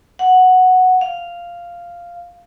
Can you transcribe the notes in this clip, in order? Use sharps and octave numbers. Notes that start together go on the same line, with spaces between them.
F#5
F5